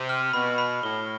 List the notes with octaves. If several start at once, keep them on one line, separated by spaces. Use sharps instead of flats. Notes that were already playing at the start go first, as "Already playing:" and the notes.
Already playing: C3
F6
B2 B5
B5
A2 G7